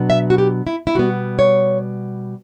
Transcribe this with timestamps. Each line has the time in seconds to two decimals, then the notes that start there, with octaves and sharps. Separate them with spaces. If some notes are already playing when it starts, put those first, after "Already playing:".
Already playing: B2 F#3 B3 D4
0.10 E5
0.30 F#4
0.38 G4
0.67 E4
0.87 E4
0.95 B2 G3 B3 F#4
1.39 C#5